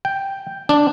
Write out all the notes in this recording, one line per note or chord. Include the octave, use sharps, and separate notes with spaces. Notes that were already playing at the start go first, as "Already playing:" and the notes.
G5
D4